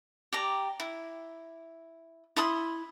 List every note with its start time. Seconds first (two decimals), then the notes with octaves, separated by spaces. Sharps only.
0.33 G4 D5 A#5
0.80 E4
2.36 E4 B5 C6 D#6